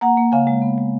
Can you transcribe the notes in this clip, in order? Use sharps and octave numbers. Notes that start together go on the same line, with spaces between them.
A#3 F#5 A#5
A#3
C#3 F5 G#5
G#3
B3
G#3